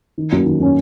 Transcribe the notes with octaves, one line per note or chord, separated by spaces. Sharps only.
D#3
F#3 A#3 C#4
D#3
F#3 A#3 C#4